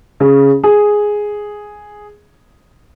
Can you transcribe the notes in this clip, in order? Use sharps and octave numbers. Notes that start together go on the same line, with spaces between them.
C#3
G#4